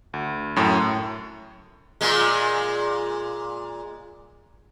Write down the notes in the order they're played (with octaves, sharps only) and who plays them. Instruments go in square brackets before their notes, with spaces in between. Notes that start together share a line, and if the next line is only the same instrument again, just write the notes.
[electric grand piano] D2
F#2 A2
[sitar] A#2 G#3